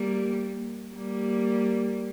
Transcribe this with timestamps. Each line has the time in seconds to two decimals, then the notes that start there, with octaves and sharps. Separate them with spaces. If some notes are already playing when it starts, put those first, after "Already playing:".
Already playing: G3 A#3
0.94 G3 A#3